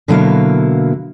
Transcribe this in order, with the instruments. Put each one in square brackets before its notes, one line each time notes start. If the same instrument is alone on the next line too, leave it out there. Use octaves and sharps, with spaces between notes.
[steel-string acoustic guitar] B2 D3 F#3 A#3 E4 F5